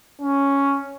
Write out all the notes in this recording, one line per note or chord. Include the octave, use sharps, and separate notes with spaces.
C#4